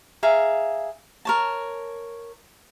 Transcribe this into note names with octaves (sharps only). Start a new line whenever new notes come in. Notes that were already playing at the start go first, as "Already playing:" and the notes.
G#4 E5 F5 A#5
A#4 C#5 A5